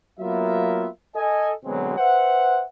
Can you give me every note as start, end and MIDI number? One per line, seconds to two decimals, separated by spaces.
0.20 0.88 54
0.20 0.88 58
0.20 0.88 59
0.20 0.88 65
0.20 0.88 70
0.20 0.88 76
1.16 1.52 69
1.16 1.52 75
1.16 1.52 80
1.65 1.97 47
1.65 1.97 50
1.65 1.97 54
1.65 1.97 56
1.65 1.97 59
1.65 1.97 60
1.97 2.64 71
1.97 2.64 72
1.97 2.64 76
1.97 2.64 78